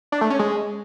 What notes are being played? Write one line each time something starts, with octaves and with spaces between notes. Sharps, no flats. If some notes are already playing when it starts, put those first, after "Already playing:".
D4
A3
C#4
G#3